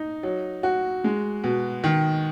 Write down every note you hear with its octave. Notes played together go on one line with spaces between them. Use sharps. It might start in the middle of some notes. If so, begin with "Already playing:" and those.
Already playing: D#4
F#3
F#4
G#3
B2
D#3